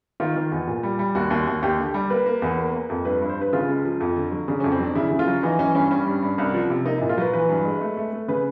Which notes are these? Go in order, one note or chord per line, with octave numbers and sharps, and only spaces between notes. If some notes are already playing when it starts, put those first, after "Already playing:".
D#3 F4
D#3
E2
A#2
G3
G3
D#2 F#4
D#2
D#2
D#2 G4
D3
G4
G3
A#3 B4
A#3
E2
A#3
A#3
F2
G2 B4
G2
C5
G2 B4
C#3 F4
C#2
F3
F2
D3
F#3
C#3 D4
F2 C#4
C4
F#3 D4
C#3 E4
C#3
F4
F#3
E3 D#4
E3 C#4
G2 C#4
G3 C#4
G2
G2
C2
F3
C3
A#3 D#4
A#2 E4
F4
F#3 B4
E3 B4
G2
G#3
A3
A3
A3
C#3 B4